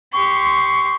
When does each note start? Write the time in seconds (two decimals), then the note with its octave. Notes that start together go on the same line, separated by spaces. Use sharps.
0.13 G4 C6 C#6